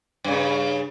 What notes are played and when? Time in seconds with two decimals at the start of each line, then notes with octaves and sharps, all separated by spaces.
0.24 G2 C#3